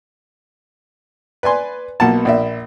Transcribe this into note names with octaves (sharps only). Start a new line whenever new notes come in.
B4 D5 G#5 C6
B1 B2 A#3 F#5 A5
A#1 D5 E5